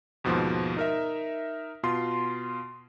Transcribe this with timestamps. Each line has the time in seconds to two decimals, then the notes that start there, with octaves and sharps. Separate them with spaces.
0.24 D#2 G#2 B2 F3
0.76 D#4 A#4 E5
1.83 B2 F4 C6